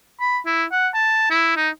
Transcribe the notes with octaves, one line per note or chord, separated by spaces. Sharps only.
B5
E4
F#5
A5
E4
D#4